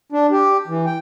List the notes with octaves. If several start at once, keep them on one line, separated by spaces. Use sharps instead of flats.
D4
G4
E3
G5